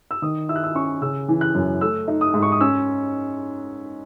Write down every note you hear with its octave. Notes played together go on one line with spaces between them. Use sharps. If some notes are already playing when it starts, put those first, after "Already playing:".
E6
D#3 D#6
E4 E6
F#6
E6
C#4 C#6
C#3 E6
E3
F#6
F#2
A3 E6
D#4
D#6
G#2
C#6
D#6
C#4 E6